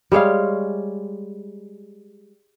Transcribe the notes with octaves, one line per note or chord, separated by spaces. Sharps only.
G3 G#3 C#5 F5